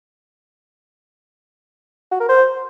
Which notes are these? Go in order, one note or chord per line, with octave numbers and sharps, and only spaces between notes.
F#4
A#4
C5